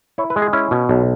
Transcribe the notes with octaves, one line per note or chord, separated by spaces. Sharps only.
E4 C#5
B4
G#3
G#4
C#4 E4
B2
B1